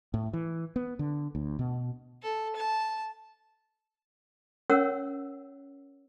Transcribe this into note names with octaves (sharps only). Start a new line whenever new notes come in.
A2
E3
B3
D3
D2
B2
A4
A5
C#4 A#4 C#5 F#5 E6